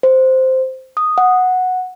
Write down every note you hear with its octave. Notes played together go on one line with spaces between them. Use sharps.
C5
D#6
F#5